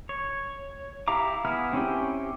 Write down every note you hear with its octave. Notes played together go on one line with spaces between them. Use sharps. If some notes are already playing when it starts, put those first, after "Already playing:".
C#5
E4 G4 F5 A#5 D6
B3 E4 G#4 F6
C4 C#4 E4 G4